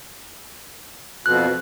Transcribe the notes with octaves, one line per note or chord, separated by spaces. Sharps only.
F2 B2 F#6